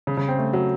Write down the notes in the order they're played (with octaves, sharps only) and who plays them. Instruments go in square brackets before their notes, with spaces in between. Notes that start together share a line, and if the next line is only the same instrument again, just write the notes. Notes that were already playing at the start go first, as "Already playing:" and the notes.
[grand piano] C#3
C#3
C4
A3
F#3